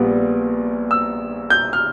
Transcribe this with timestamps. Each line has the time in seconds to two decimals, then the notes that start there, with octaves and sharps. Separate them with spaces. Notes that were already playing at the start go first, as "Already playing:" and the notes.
Already playing: A#1 A#2 G3 B3
0.91 E6
1.50 G6
1.73 F6